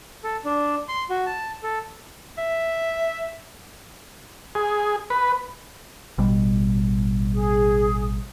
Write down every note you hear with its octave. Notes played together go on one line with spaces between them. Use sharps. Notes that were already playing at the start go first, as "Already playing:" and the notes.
A4
D4
C6
F#4
A5
A4
E5
G#4
B4
A1 B2 G3
G#4